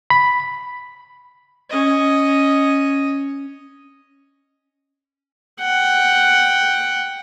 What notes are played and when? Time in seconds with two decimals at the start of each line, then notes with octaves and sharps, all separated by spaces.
0.10 B5
1.70 C#4 D#5
5.61 F#5 G5